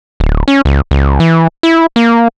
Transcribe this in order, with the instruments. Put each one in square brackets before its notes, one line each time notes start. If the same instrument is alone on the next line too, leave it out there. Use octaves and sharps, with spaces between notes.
[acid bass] D1
C#4
C#2
C#2
E3
E4
A#3